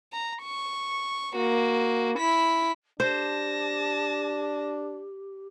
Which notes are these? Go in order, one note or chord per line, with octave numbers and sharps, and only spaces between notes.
A#5
C#6
A#3 F#4
E4 B6
D4 G4 C5 A5 A#6